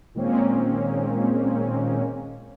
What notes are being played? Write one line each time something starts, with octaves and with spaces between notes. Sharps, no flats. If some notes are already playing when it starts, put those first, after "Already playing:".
A#2 D#3 G#3 A#3 C4 C#4